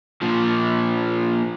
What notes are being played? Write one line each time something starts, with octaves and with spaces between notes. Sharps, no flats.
A#2 F3